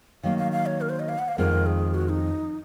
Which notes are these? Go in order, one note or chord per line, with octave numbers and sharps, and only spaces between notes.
D#3 F#3 A#3 F5
F5
F5
C#5
A#4
C5
D#5
F5
F#5
F5
F2 D#3 G#3 C4 F4 A#4
G#4
F#4
D#4